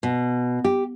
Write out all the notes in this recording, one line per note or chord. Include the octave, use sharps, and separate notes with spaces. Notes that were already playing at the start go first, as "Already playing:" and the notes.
B2
G4